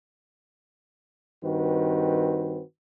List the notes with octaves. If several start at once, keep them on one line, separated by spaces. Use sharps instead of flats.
G2 D#3 C4 F#4 B4